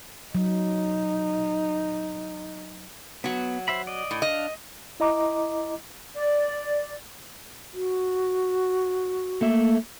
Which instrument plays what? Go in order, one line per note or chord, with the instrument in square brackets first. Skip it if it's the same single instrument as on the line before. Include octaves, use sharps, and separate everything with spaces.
[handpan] F#3 [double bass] D#4
[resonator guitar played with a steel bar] F#3 F#4 [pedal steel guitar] B3
[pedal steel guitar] C5 E5 B5
D5 D#5
[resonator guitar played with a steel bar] A2
[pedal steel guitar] D4 F5 [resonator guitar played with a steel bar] D#5
[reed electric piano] E4 D#5 A#5 D6
[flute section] D5
[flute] F#4
[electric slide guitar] A3 A#3 E5